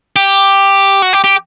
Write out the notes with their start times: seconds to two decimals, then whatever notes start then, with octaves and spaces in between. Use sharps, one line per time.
0.16 G4
1.02 F#4
1.13 G4
1.24 G4